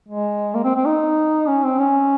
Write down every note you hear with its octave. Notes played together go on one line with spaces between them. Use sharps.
G#3
A#3
C4
C4
D#4
C#4
C4
C#4